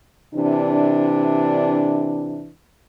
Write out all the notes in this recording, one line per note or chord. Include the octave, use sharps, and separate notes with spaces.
C3 E3 D4